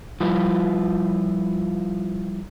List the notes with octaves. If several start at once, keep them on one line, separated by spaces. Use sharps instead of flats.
F3 G3 E4 F4 B4